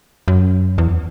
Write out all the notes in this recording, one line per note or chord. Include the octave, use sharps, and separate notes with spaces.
F#2
E2